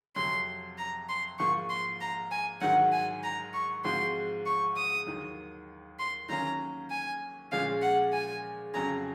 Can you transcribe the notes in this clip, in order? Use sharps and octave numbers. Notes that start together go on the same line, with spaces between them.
F2 C3 F#3 C6
A#5
C6
G#2 F3 A#3 C#6
C6
A#5
G#5
G#2 D#3 F#3 F#5
G#5
A#5
C#6
G#2 F3 G#3 C4 F#4 C6
C#6
D#6
D#2 D#3 F#3
C6
D#3 F#3 A#3 C#4 A#5
G#5
A#2 F3 G#3 C#4 F5
F#5
G#5
F2 C#3 F#3 C#4 G#4 A#5